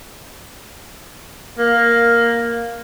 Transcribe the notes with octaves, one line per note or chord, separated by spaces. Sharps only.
A#3